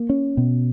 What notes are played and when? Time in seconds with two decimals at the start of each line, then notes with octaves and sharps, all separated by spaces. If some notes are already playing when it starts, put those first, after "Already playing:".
Already playing: A#3
0.09 C#4
0.37 B2